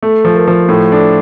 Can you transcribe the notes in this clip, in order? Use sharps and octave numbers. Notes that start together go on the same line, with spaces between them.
A3 A4
F3
A#4
F3
A2 A4
D4 A4